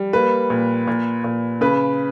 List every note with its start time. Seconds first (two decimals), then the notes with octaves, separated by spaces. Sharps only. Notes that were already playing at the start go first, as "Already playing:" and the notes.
Already playing: G3
0.13 A#3 B4
0.50 A#2
0.87 A#2
1.24 A#2
1.61 C#3 B4